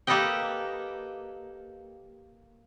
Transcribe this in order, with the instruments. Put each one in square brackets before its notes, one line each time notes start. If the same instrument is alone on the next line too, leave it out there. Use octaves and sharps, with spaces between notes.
[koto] A#3 G4 A4 B4 D#5 G5